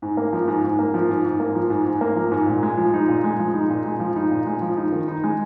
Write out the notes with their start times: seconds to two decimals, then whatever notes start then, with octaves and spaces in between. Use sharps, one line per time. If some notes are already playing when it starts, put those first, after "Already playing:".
0.02 G#2
0.17 A#3
0.33 F3
0.48 G#2
0.64 G#2
0.79 A#3
0.94 F3
1.09 G#2
1.25 G#2
1.40 A#3
1.55 F3
1.70 G#2
1.86 G#2
2.01 A#3
2.16 F3
2.31 G#2
2.47 A#2
2.63 G#3
2.77 F3
2.94 D#4
3.08 A#2
3.24 G#3
3.40 F3
3.54 D#4
3.70 A#2
3.85 G#3
4.00 F3
4.16 D#4
4.31 A#2
4.47 G#3
4.62 F3
4.77 D#4
4.92 D#3
5.08 D#4
5.24 G#3